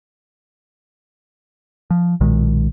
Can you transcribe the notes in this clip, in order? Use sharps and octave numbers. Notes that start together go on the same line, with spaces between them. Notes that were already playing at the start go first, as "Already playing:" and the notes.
F3
B1 A#2 D#3 G#3